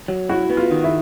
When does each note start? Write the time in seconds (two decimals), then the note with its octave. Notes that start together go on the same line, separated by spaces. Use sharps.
0.08 F#3
0.29 E4 F#4
0.50 B3
0.57 F4
0.71 D#3
0.84 E4